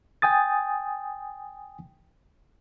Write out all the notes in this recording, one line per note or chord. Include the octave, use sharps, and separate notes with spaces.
G5 G#5 D#6 A6